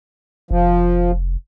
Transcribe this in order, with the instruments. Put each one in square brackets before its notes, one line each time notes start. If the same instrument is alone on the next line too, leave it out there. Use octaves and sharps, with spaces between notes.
[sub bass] F1 [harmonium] F3